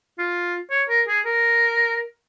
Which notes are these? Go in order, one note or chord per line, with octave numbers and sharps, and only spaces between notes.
F4
C#5
A#4
G#4
A#4